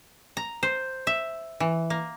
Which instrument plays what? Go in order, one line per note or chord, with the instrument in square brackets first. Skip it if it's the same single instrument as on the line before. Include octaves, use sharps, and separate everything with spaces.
[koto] A#5
C5
E5
E3
A#3